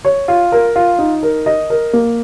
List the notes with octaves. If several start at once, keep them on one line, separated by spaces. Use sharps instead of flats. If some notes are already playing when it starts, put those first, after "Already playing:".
C#5
F4
A#4
F4
D#4
A#4
D#5
A#4
A#3